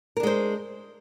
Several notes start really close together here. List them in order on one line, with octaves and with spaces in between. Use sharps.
A#4 D4 G#3 C5